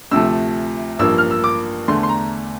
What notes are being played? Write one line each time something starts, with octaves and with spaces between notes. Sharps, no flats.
D2 C3 F3 A3 E6
A1 G2 F3 A#3 E6
F6
E6
D6
E2 D3 A3 C6
C6
A#5